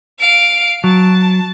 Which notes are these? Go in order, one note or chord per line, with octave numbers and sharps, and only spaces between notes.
F5 D7
F#3 A5